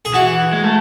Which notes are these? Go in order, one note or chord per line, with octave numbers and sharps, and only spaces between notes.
G#4
E3 F#4
G#3
A3